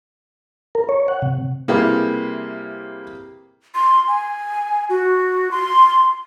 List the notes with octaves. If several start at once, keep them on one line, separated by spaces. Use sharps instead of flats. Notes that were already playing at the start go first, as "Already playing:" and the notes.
A#4
C#5
F#5
C3
C3 G3 A#3 E4 G#4 B4
C6
G#5
F#4
C6